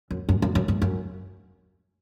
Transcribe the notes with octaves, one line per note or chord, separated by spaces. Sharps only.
F#2
F#2
F#2
F#2
G2
F#2